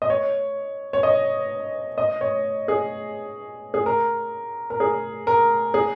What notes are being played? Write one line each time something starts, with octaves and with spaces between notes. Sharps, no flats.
D#5
C#5
C#5
D#5
D#5
C#5
G#4
G#4
A#4
A#4
G#4
A#4
G#4